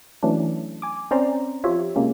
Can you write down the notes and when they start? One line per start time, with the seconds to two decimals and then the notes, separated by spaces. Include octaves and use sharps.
0.23 E3 F#3 A3 C#4 D4
0.82 G#5 D6
1.11 C4 C#4 C5 D5 A#5 C6
1.64 F3 F4 G4 C#5 E5
1.96 C3 G#3 A#3 C#4